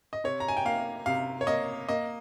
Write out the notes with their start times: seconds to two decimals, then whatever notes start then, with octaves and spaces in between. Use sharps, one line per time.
0.13 D#5
0.24 C3 C#5
0.40 A#5
0.48 G#5
0.57 G5
0.65 A#3 F5
1.06 C3 F5
1.41 C#5
1.47 A#3 D#5
1.89 A#3 D#5